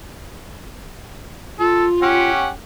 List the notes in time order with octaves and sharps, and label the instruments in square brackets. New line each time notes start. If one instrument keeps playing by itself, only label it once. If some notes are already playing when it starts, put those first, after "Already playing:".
[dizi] F4 [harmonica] A4
[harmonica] C#4 G4 F#5